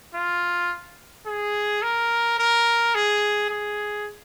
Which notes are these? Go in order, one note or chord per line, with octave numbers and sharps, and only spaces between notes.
F4
G#4
A#4
A#4
G#4
G#4